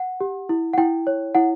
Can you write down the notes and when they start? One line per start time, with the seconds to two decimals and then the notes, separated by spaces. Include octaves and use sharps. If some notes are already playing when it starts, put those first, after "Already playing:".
Already playing: F#5
0.21 G4
0.49 E4
0.73 F#5
0.78 E4 G5
1.07 C#5
1.35 E4 F#5